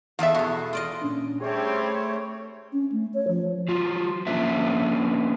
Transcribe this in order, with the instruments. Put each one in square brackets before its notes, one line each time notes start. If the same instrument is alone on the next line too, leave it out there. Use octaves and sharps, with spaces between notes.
[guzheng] E2 G#4 A4 [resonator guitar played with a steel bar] E5 F5
[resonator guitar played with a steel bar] B2 [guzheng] F#4 G#4
[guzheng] F4 D5 D#5
[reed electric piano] A#2 C#4 D4
[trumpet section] G3 C4 [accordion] A3 C#5 [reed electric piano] G#4
[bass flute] C#4
A3
C#5
F3
[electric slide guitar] F#3 F4
F3 A#3 C#4 D4 B4 E5